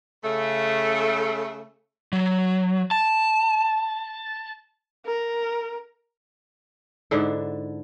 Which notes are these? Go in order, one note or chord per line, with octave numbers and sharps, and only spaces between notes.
C#3 A3
F#3
A5
A#4
G#2 D3 D4 E4